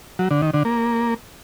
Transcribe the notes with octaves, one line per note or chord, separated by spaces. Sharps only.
F#3
D3
D#3
D3
A#3